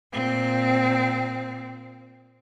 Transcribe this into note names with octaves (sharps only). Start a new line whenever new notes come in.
A#2 C4